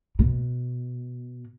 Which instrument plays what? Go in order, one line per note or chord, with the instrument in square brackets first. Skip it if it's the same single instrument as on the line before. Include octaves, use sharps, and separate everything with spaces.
[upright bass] B2